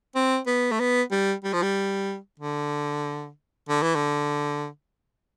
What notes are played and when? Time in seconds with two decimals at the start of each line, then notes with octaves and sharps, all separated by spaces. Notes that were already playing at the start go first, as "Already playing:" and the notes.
0.15 C4
0.47 B3
0.72 A3
0.80 B3
1.11 G3
1.44 G3
1.53 F3
1.62 G3
2.40 D3
3.69 D3
3.82 E3
3.95 D3